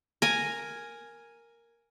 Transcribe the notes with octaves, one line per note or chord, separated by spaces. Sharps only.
A#4 G#5